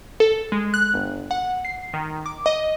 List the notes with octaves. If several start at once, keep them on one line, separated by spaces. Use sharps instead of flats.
A4
G#3
F#6
G1
F#5
C7
D#3
D6
D#5